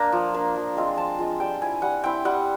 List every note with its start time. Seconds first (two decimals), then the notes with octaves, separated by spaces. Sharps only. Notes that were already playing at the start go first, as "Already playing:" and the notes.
Already playing: A#3 D4 A#5
0.12 F3
0.34 A#3 D4
0.56 F3
0.77 G#3 C4 F4
0.97 F3 A5
1.19 G#3 C4 F4
1.40 G3 G5
1.61 C4 E4 G#5
1.82 G3 F#5
2.04 C4 E4 G5
2.25 G3 F#5